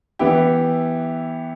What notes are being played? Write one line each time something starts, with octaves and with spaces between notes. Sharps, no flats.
E3 B3 E4 G4